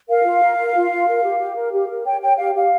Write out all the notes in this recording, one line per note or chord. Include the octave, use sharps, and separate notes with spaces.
A#4 F5
F4
A#4
A#4
F4
F4
A#4
G4
G4
A#4
G4
A#4
C#5 G5
C#5 G5
G4 F5
G4 F5